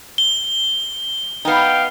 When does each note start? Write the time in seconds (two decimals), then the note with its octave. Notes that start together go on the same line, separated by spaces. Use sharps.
0.18 G7
1.45 B3 D#4 F5 G5